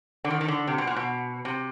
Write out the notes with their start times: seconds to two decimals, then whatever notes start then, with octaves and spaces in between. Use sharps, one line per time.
0.24 D3
0.30 D#3
0.41 D#3
0.48 D3
0.67 C3
0.78 B2
0.87 A#2
0.96 B2
1.45 C3